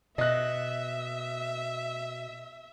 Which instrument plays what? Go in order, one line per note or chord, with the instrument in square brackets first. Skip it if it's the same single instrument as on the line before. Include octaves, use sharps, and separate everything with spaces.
[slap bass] B2 [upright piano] D#5 F#6 [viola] E5